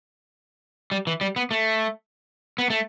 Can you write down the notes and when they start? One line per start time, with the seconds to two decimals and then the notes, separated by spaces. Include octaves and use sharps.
0.91 G3
1.07 E3
1.21 G3
1.36 B3
1.51 A3
2.58 B3
2.70 A3